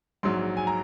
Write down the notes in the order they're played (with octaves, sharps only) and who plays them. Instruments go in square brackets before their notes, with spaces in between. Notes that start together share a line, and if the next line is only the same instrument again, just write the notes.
[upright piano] A#1 G#2 F#3 C6
G#5
A#5